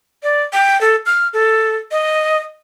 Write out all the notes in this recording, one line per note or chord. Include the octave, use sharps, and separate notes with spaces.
D5
G5
A4
F6
A4
D#5